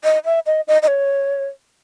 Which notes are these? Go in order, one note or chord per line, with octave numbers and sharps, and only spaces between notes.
D#5
E5
D#5
D#5
D#5
C#5